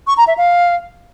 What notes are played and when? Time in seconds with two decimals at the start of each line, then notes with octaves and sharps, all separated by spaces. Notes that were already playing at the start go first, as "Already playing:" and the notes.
0.07 C#6
0.17 A#5
0.27 E5
0.37 F5